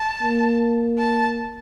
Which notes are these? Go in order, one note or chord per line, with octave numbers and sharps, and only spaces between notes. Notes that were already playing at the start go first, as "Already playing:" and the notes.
Already playing: A5
A#3
A5